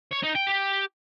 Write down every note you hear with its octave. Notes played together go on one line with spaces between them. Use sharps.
C#5
D#4
G5
G4